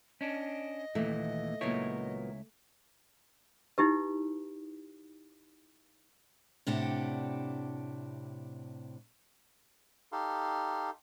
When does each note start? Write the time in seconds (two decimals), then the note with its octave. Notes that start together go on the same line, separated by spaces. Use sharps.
0.21 C#4 D4 D#5
0.95 D#2 A#2 E3 A3
1.61 C#2 A#2 F#3 B3 E4 C#5
3.78 D#4 E4 G4 B4
6.67 A2 C3 D4 G4 F#5
10.12 D#4 G4 A4 F5 C6